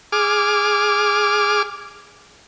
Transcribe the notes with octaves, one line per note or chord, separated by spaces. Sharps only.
G#4 D6 F6